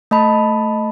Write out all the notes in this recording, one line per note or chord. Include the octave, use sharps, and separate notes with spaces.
A3 D#5 A5 B5